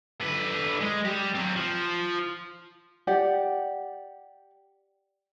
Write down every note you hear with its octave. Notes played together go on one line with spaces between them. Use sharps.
D3 B4
G#3
G3 G4
F#3 C4
F3
G4 D5 F#5